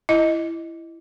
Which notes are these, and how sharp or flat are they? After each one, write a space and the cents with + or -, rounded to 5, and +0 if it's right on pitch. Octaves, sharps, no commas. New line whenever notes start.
E4 +15 D#5 +0